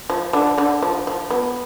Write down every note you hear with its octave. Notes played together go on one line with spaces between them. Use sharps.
F3
D3 D4
D3 D4
F3
F3
B3